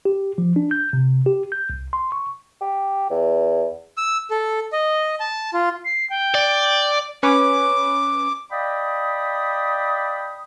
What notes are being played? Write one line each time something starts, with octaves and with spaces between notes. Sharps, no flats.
G4
F3
D4
G6
C3
G4
G6
C2
C6
C#6
G4
E2
E6
A4
D#5
A5
F4
C7
G5
D5
C#4 B4 C#5 D6
D5 D#5 F5 G5 B5 D#6